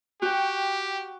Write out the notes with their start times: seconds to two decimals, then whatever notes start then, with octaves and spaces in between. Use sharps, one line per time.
0.22 F#4 G4 G5